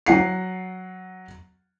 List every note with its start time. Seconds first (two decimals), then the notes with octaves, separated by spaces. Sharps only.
0.06 F#3 F#5 C7